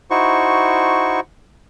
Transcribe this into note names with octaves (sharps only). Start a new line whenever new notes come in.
D#4 E4 F#4 C5 C#6